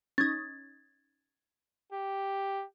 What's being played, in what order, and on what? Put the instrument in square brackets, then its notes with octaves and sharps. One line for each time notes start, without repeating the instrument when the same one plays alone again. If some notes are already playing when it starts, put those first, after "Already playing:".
[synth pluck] C#4 D#4 [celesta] G#6 A6
[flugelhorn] G4